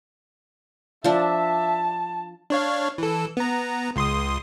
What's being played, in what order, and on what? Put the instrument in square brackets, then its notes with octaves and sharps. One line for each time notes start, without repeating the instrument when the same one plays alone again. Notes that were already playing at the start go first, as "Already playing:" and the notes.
[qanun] F3 D4 [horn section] E5 [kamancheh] A5
[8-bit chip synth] D4 C#5 F5
E3 A4
B3 A#5
C#2 C6 D#6